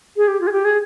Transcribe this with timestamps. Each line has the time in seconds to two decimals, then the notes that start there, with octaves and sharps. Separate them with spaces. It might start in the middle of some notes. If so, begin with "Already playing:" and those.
0.17 G#4
0.28 G4
0.41 F4
0.47 G#4
0.52 G4
0.65 G#4